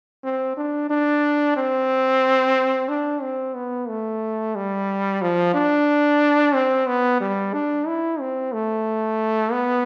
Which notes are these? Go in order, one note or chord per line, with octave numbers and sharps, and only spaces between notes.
C4
D4
D4
C4
D4
C4
B3
A3
G3
F3
D4
C4
B3
G3
D4
E4
C4
A3
B3